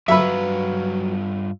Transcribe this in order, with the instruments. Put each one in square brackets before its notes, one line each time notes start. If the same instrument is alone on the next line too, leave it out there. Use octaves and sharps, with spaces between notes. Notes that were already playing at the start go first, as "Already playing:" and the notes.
[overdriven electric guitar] G2 F4 [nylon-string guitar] F#3 B4 [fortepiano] E5 B5